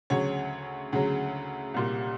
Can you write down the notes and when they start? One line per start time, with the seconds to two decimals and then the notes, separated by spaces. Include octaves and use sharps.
0.10 D2 C#3 F#3 C#5
0.92 D2 C#3 F#3
1.74 C2 A#2 G3